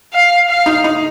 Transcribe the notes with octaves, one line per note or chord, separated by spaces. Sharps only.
F5
F5
D#4
D#4